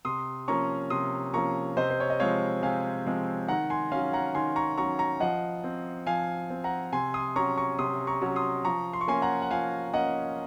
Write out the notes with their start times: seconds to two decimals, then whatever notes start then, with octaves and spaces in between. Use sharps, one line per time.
0.05 C3 C6 D#6
0.48 F3 A#3 C#4 A#5 C#6
0.90 C3 C6 D#6
1.34 F3 A#3 C#4 A#5 C#6
1.77 C3 C5 D#5
1.90 C5
2.00 C#5
2.10 D#5
2.20 F3 G#3 C4 C#5 F5
2.63 C3 F5 G#5
3.06 F3 G#3 C4
3.48 D#3 F#5 A#5
3.70 G#5 C6
3.92 F#3 C#4 F5 G#5
4.13 F#5 A#5
4.35 D#3 G#5 C6
4.56 A#5 C#6
4.78 F#3 C#4 A#5 C#6
4.99 A#5 C#6
5.20 F3 D#5 F#5
5.64 C4
6.07 F3 F5 G#5
6.50 C4
6.64 F#5 A#5
6.93 C3 G#5 C6
7.14 C6 D#6
7.36 F#3 C#4 A#5 C#6
7.57 A#5 C#6
7.79 C3 C6 D#6
8.07 A#5 C#6
8.21 F#3 C#4
8.36 C6 D#6
8.65 F3 A#5 C#6
8.93 C6
9.01 C#6
9.08 A#3 C#4 G#5 C6
9.22 F#5 A#5
9.42 F#5
9.51 F3 F5 G#5
9.93 A#3 C#4 D#5 F#5